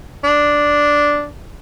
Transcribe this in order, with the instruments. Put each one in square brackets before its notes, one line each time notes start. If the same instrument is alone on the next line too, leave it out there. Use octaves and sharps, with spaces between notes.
[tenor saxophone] D4